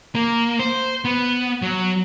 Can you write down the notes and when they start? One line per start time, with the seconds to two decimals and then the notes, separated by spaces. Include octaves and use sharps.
0.15 A#3
0.59 C5
1.05 B3
1.62 F#3